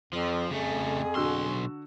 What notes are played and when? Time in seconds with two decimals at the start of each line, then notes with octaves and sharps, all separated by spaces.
0.13 F2 F3
0.51 F2 C#3 A3 G#4
1.15 B1 D3 F#4 C6 E6